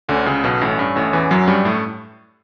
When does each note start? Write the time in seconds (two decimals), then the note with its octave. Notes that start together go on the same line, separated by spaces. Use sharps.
0.09 D2 D3 C#4
0.26 C#2 C#3
0.44 B1 B2
0.61 A1 A2 C#4
0.79 G2
0.96 A1 A2
1.13 E2 E3
1.31 F#2 F#3
1.47 G2 G3
1.65 A2 A3